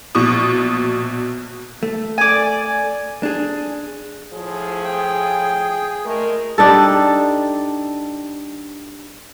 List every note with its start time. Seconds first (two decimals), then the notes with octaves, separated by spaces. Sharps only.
0.15 A#1 B2 C#6 D#6
1.83 A3
2.18 D5 G#5
3.23 D4 G#4
4.34 A2 F3 G#4
4.85 G5
6.05 A#2 G#3 A3 A#4
6.58 G3 D4 D#4 A4